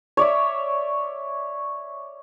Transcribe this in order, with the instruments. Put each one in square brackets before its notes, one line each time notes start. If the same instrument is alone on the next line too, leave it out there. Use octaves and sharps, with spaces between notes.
[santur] C#5 D5 E5